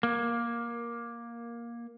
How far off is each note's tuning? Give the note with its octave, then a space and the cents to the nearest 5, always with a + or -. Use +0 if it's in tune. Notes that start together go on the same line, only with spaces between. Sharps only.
A#3 +10